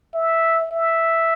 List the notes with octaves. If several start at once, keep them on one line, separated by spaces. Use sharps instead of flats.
E5
E5